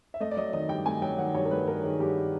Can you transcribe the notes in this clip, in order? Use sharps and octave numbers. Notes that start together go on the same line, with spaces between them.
E5
A3 D#5
D5
F#3 D#5
D#3 D#5
G2 G5
A3 G#5
F#3 G5
D#3 F#5
G2 C#5
A#4
A3 B4
F#3 A#4
D#3 G#4
G2 G4